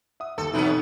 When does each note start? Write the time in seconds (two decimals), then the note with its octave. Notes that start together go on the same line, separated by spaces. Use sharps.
0.20 E5 F#5 D#6
0.38 G1 D#2 A4
0.54 B2 E3 F#3 B3 C4 D#4